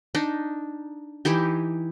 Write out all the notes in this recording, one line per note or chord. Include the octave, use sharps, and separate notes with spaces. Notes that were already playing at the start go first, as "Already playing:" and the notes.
D4 D#4
E3 D#4 E4 G4